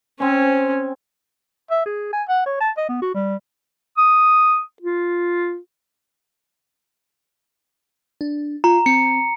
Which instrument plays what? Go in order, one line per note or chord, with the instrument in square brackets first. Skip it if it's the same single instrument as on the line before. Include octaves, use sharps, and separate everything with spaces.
[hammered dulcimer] C4 G#5 [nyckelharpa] C#4
[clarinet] E5
G#4
G#5
F#5
C#5
A5
D#5
B3
F#4
G3
D#6
F4
[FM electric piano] D4
[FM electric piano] F4 [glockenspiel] A#5
[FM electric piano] C4 [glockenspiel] C#7